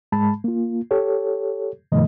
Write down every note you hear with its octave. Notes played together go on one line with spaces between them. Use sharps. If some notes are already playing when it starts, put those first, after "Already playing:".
G#2 G#3 A5 B5
A#3 F4
G4 A4 C#5
G2 B2 D#3 F3 A3 D#5